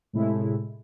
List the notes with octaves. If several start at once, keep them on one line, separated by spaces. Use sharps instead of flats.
A2 C3 G#3 A3 E4